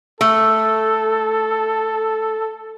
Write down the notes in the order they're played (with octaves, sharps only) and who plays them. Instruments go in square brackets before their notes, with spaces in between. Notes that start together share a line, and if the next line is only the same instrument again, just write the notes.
[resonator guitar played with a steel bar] A3 [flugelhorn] A4